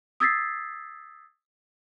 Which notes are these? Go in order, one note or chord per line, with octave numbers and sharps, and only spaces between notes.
D#6 E6 G#6 A6 B6 C7